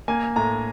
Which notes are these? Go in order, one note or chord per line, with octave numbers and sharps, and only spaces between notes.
A#3 G#5
A2 A#5